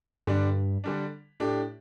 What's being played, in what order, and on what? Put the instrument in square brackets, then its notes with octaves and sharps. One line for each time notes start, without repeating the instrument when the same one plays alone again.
[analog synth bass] G2 [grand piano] D3 G3 D4
[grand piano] D3 G3 D4
A2 A3 D4 G4